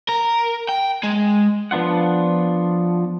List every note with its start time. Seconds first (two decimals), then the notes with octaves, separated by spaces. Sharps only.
0.09 A#4
0.69 G5
1.04 G#3
1.71 F3 B3 D4 F4 F#5